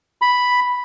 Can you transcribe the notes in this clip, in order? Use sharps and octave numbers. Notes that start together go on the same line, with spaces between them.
B5